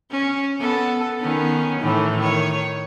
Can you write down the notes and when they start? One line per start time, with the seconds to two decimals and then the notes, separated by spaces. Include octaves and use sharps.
0.11 C#4
0.59 B3 A4
1.21 D#3 B3 C#4
1.80 A2 D#3 E3
2.18 D#3 C#5